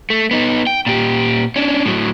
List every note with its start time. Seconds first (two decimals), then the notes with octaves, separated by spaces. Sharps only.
0.10 A3
0.31 B3 D#4
0.67 G5
0.86 A#2 G4
1.56 C#4 D4
1.85 A2 F#3